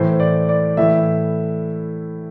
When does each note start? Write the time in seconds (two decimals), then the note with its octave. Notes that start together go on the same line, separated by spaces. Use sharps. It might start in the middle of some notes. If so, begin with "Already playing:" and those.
Already playing: A2 E3 C5
0.20 D5
0.49 D5
0.77 A2 E3 E5